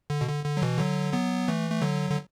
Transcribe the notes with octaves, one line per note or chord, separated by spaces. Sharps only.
D3
B2
D3
D3
F#3
B2 E3
D3 F#3
F#3 B3
E3 A3
A3
D3 F#3
D3